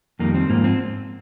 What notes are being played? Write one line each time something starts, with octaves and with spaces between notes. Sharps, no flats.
F2 D#3 G3 A#3
C4
G#2 F3 A#3
C4